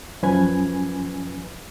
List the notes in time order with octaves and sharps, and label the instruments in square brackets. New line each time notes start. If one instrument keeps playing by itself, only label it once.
[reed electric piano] F#2 F3 C#4 B4 G#5 G#6